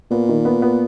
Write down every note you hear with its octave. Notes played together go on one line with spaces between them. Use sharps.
A#2 B3
D#3
B3
B3